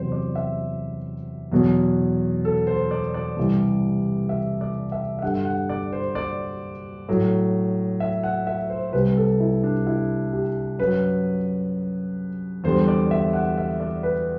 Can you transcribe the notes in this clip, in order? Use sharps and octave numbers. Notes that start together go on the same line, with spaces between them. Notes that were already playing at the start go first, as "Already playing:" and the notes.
Already playing: E2 C3 F#3 C5
D5
E5
E2 B2 F#3
A4
C5
D5
D5
C2 C3 E3 G3
E5
D5
E5
E5
G2 D3 G3 F#5
F#5
D5
C5
D5
A2 F#3
E5
F#5
E5
C5
C2 C3 G3 B4
A4
E4
D4
E4
G4
F#2 F#3 B4
E2 D3 G3 C5
D5
E5
F#5
E5
D5
B4